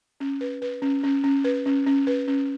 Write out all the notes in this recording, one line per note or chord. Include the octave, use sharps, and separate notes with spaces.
C#4
B4
B4
C#4
C#4
C#4
B4
C#4
C#4
B4
C#4